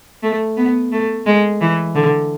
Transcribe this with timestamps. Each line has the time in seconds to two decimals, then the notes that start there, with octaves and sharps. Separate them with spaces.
0.23 A3
0.57 B3
0.92 A3
1.26 G#3
1.61 E3
1.95 D3